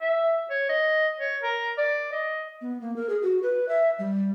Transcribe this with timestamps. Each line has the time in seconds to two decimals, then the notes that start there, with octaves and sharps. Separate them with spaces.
0.02 E5
0.50 C#5
0.69 D#5
1.19 C#5
1.43 A#4
1.78 D5
2.12 D#5
2.61 B3
2.81 A#3
2.96 A#4
3.10 G#4
3.22 F#4
3.43 B4
3.69 E5
3.99 G3